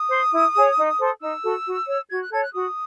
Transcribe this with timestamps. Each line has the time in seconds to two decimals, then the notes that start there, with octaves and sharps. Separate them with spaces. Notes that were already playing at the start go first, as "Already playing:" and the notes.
Already playing: D#6
0.10 C5
0.33 E4
0.55 G#4 C#5
0.78 D#4
0.99 A4 C5
1.21 D#4 E6
1.43 F#4 A4
1.65 F#4
1.87 C#5
2.10 F#4 G#6
2.21 F#6
2.32 A4 C#5 G#6
2.43 F#6
2.53 F#4 D#6